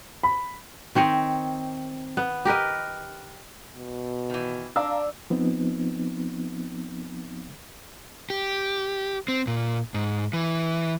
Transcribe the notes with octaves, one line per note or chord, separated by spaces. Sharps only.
B5
D#3 C4 C#5 D#5
B3
G4 A#4 B4 D#5
B2
D#3 E3
D4 F5 A#5 E6
F3 B3 C4 D#4
G4
C4
A#2
G#2
E3